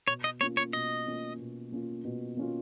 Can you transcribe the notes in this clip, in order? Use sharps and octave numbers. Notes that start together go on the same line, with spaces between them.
B2 C#5
D#5
A#3 C#4 F4 C#5
C#5
B2 D#5
A#3 C#4 F4
B2
A#3 C#4 F4
B2
A#3 C#4 F4